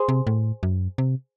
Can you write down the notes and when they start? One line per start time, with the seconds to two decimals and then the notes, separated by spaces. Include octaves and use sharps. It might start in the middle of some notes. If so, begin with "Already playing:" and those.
Already playing: G#4 C5
0.09 C3
0.27 A2
0.63 F#2
0.98 C3